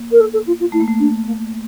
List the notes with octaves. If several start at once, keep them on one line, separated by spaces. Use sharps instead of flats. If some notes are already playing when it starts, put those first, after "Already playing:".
Already playing: A#3
A#4
A4
A4
F4
F4
A3 E4
A#3
A3
D4
A#3